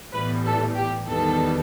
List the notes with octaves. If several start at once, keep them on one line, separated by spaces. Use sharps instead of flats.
A2 E3 G3 B3 B4
A4
G4
E2 D#3 G3 B3 A4